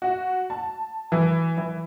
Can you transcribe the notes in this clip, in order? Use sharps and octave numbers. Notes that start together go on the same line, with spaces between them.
F#4
A5
E3
E3